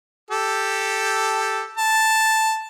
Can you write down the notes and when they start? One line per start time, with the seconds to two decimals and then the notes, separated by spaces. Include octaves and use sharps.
0.31 G4 A4
1.78 A5